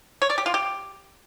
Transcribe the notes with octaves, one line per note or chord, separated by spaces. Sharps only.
C#5
D5
G4
F4
G4